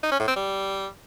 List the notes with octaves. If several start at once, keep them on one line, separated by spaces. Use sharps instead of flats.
D#4
C#4
A2
C4
G3